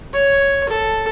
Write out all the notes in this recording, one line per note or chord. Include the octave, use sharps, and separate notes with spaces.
C#5
A4